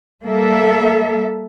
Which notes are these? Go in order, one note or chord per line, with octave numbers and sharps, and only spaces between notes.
G3 A#3 A4 E5